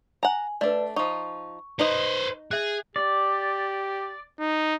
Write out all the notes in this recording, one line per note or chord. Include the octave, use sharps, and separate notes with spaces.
F#5 G#5 A#5
A3 D4 B4 D5
F3 D#4 C#6
D#4 B4 C5 D#5
G#4 E5 F#6
G4 D5
D#4